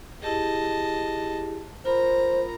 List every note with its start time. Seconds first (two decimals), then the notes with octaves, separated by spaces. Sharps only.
0.22 E4 G4 G#4 D#5 A5
1.85 F4 A#4 C5 A#5 B5